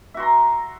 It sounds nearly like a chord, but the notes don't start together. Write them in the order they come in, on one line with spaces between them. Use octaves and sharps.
E5 F#4 C6 A#5